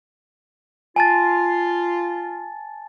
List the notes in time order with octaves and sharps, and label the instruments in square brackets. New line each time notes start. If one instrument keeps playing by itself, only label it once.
[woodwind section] F4 [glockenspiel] G#5 A5 A6